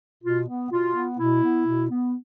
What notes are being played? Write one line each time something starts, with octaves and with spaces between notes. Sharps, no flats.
B2 F4
B3
B2 F4
B3
B2 E4
B3
B2
B3